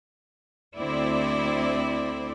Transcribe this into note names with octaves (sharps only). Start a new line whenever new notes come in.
D2 C4 E4 D5